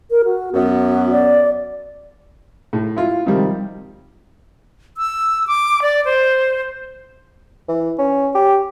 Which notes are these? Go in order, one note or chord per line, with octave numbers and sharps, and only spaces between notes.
A#4
F#4
F#2 B3 F#4
D5
A2
E4 F4
C3 D#3 F3 G3
E6
D6
D5
C5
E3
C#4
G4